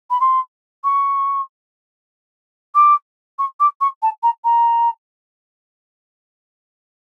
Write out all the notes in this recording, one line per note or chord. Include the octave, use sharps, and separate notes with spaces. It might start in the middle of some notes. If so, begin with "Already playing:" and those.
B5
C6
C#6
D6
C#6
D6
C#6
A5
A#5
A#5